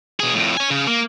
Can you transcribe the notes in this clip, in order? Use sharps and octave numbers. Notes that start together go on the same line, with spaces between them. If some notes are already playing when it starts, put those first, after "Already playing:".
B2 G#4
F2 A2
C#5 G#5
C#3
A#3